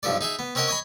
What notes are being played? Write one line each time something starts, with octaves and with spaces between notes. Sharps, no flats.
B1 G2 F3 A4 D5
D#4 G#4 E5
B3
C4 C#4 A#4 D#5 F#5 G#5
C#5 D#5 G#5 B5